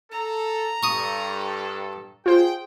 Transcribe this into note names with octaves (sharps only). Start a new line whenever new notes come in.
A4 A#5
G2 A4 C#6 D#6
F4 G#4 C5 G5